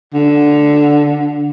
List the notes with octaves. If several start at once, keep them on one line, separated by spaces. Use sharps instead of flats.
D3